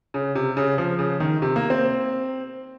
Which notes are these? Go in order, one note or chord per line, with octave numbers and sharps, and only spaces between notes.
C#3
C3
C#3
F3
C#3
D#3
C3
A#3
C4